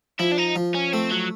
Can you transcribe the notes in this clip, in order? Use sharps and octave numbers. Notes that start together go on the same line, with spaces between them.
F3 E4
D4
D#4
F3
C#4
A3 C4
F#3